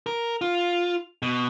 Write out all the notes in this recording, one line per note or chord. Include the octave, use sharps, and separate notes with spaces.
A#4
F4
B2